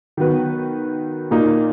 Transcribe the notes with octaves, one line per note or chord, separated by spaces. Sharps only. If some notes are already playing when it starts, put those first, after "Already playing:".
D#3 F#3 B3 F#4 B4
A#2 A#3 D#4